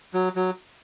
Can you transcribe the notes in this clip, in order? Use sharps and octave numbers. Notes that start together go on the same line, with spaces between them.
F#3
F#3